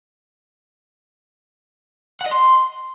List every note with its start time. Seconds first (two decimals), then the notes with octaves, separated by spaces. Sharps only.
2.21 F#5
2.26 D#5
2.31 C6